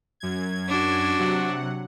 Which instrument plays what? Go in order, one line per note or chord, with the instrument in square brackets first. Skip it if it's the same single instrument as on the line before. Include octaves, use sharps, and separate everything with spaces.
[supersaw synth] F#2 G#6
[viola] D4 F#4
[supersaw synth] C3 F#3 F#5